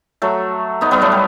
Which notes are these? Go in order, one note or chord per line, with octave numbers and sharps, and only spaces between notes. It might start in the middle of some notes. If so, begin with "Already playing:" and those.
F#3 A3
B3 D#4
G3 B3
F#3 A3
G3